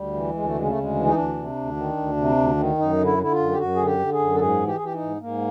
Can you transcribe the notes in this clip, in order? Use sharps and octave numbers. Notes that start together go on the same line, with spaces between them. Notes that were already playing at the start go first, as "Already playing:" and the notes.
Already playing: D2 G3
E3
D2 G#3
A3
C#3 G#3
A3
D2 G#3
E3
D#4
D2 D4
C3
D2
D#3
D2
C3
D2
D#3
F#2 D#4
D3
E4
D3 E4
F4
F#2
G4
F#2 F#4
D3 G#4
G4
D3
G#4
F#2
A4
G#2 G#4
E3
G4
G#4
E3 G4
D#4
G#2
G#2 A#3